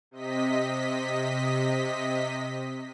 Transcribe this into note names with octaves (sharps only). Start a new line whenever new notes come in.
C3 D#5 B6